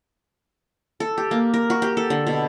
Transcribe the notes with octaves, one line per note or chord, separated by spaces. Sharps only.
A4
G4
A#3
A#4
F#4
G4
A4
D3
B2